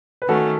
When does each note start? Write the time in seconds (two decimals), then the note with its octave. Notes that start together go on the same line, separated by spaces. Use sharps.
0.22 B4
0.28 D#3 A3 C#4 F#4 A4